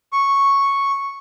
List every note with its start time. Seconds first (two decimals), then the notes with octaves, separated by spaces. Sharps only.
0.13 C#6